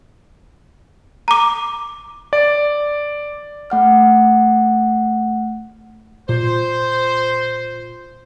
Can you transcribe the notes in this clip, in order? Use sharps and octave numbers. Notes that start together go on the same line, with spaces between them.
A#5 D6
D5
A3 F#5 F6
A#2 C5